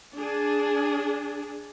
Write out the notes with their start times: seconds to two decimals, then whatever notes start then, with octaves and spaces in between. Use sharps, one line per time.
0.15 D4 G#4